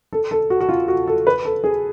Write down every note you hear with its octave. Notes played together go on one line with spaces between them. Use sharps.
A4
A4
F#4
F#4
F4
F#4
A4
B4
A4
G#4